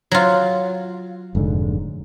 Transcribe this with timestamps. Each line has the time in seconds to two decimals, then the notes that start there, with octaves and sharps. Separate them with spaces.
0.11 F#3 F4
1.35 F1 G#2 D3